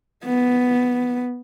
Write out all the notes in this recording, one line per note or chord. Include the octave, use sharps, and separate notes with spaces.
B3